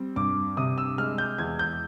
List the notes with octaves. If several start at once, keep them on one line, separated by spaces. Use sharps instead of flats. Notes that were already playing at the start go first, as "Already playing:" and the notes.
Already playing: G3 C4
G2 D6
C3 D#6
E6
G#3 F6
G6
E2 G#6
G6